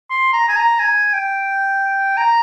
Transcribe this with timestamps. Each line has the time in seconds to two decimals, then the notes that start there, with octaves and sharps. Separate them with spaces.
0.10 C6
0.33 A#5
0.49 G#5
0.57 A#5
0.79 G#5
1.14 G5
2.17 A#5